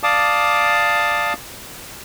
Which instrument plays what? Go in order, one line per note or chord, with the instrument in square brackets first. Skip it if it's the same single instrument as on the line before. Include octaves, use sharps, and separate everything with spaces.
[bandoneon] D5 F5 A5 D6 D#6